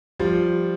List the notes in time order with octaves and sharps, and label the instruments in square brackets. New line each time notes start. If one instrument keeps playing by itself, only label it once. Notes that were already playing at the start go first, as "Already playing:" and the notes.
[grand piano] F3 G3